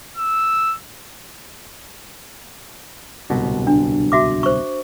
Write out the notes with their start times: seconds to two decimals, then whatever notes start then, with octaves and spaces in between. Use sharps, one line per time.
0.17 E6
3.30 D1 C2 B2
3.67 D4
4.12 F#4 E5 D6
4.43 C5 C#6